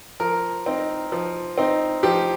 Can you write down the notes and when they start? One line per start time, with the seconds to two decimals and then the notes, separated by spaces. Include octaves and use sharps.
0.20 F3 A#4
0.66 C4 D#4
1.12 F3
1.58 C4 D#4
2.03 F3 G4